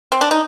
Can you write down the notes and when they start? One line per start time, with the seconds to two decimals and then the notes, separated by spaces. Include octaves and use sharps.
0.12 C4
0.21 D4
0.31 D#4